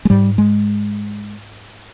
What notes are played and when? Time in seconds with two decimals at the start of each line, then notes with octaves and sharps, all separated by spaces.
0.05 G#3
0.10 G#2 G3
0.38 G#3